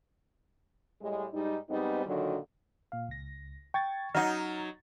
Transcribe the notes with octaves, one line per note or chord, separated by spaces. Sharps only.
A2 G3 G#3
G#2 G3 D#4
G#2 G3 B3 C4 D#4
A#2 D3 D#3 F#3
A#2 F5
C#2 A#6
G5 C#6 G#6 A6
F#3 D#4 D#5 F#5 F6